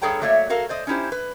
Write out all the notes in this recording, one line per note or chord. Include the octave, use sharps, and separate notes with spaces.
G2 G#4 A4 C#5 G5 A#5
F#3 A3 A#3 C#5 D5 E5
F#4 A4 A#4 F5
C5 D5 D#5
C#4 D#4 E4 G4 C5
B4